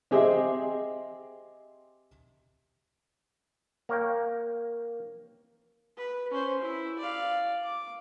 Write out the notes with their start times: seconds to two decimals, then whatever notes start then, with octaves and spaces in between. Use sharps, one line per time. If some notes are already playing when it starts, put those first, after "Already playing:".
0.11 C4 G4 G#4 C5 D#5 E5
3.89 A#3 A#4 C#5 F5 G5
5.97 B4
6.31 C#4 C5
6.62 E4
6.99 D5 F5
7.64 D6